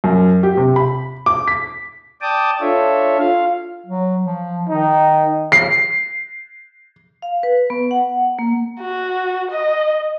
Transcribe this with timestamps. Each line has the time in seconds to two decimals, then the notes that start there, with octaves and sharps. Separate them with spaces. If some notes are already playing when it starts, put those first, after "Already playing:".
0.04 F#2
0.43 G4
0.57 C3
0.76 B5
1.26 D6
1.48 B6
2.22 D5 G5 A5 D6 D#6
2.61 D4 F4 A4 C#5 E5
3.19 F4 F5
3.86 F#3
4.26 F3
4.69 D#3 D#4
5.52 C7
7.22 F5
7.43 B4
7.70 B3
7.91 F#5
8.39 A#3
8.81 F#4
9.51 D#5